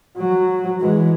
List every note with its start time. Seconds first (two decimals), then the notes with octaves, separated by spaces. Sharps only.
0.18 F#3
0.81 E3 G#3